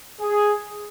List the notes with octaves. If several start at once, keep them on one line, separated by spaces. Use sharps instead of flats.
G#4